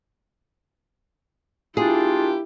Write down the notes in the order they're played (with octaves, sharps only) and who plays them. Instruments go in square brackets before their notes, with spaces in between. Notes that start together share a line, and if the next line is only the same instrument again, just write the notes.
[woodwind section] A#3 D4 F4 [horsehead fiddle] E4 [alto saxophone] G4 [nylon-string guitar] G#4